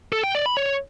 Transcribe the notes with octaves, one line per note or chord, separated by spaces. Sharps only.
A4
G5
D5
B5
C#5